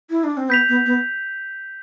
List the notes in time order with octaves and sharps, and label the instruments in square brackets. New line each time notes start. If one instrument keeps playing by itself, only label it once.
[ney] E4
D4
C4
[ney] B3 [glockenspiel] G6 B6 F7
[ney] B3
B3